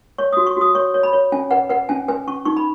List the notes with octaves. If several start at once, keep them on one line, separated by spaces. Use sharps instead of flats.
C#5 C#6
F#4 D#6
C#6
F#4 D#6
C#5 C#6
C#5
B5
C#5
C#4 G#5
B4 F#5
B4 F#5
C#4 G#5
B4 G#5
C#4 C#6
D#4 C#6
B5